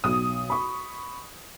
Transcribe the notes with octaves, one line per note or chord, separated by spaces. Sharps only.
B1 D#6
B5 C#6